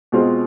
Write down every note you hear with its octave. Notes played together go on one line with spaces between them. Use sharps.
B2 G#3 C4 F4